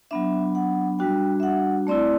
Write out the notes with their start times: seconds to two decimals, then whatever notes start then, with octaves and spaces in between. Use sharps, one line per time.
0.11 F#3 B3 D4 E5
0.55 F#5
0.99 G3 D4 F#4 G5
1.40 E5
1.43 F#5
1.87 A3 C4 E4 D5